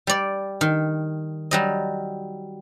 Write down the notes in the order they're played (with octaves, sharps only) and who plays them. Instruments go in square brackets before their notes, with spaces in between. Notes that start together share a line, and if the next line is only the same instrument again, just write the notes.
[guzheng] G3 D5
D#3
F#3 G3 D#5